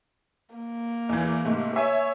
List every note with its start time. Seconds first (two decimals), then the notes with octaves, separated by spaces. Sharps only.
0.55 A#3
1.09 E2 E3
1.45 G#2 C3 A3
1.76 C#5 E5 G#5